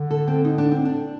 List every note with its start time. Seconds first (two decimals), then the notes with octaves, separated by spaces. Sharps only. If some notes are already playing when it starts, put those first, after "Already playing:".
Already playing: D3
0.11 A4
0.28 C4
0.45 D#4
0.58 D4
0.72 C4
0.85 D4